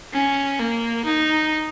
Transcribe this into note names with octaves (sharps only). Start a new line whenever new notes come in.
C#4
A#3
D#4